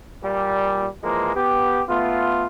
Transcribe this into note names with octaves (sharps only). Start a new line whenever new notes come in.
A#2 G3
E3 F3 G#3 A#3
B3 G4
A3 B3 F4